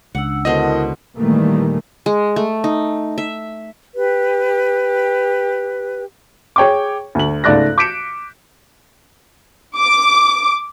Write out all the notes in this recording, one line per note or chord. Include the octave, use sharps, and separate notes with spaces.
C#2 D4 F#5 E6
B2 D3 E4 A#4 C5 D#5 A5
A#2 D#3 E3 G3 A3 A#3
G#3
A3
D#4
E5
G4 B4
G#4 C#5 G5 C#6 D6
D2 F#7
C#2 G#2 A3 D5 F#6 A#6
D6 G6 B6 C#7 D7 E7
D6